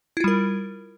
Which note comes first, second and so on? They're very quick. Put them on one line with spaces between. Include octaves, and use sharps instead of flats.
E4 F4 G3 A#4